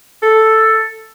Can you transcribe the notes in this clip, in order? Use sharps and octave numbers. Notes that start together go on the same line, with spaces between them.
A4